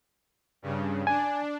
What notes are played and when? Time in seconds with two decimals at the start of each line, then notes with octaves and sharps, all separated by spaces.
0.62 G2 C#3
1.07 D4 G#5